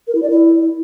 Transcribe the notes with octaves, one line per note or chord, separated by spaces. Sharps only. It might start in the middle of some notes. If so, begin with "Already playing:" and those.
A#4
E4
D5
E4